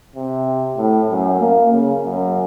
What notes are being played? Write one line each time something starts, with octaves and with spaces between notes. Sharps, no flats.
C3
A2
F#2
A#3
C#3
F#2